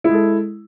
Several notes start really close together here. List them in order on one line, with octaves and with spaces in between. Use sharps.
E4 G#3 A4